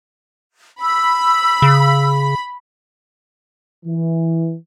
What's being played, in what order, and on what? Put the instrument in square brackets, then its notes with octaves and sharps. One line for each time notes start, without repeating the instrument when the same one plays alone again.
[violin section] B5 [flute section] E6
[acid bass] C#3
[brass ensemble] E3